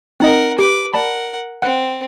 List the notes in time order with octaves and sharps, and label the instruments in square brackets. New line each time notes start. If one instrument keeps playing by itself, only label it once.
[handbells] C4 D#4 D#5 [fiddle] A#4 F#5
[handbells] G4 [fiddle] B4 D6
[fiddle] A#4 F#5 [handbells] D5 A5 B5
[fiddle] C4 [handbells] F#5 F#6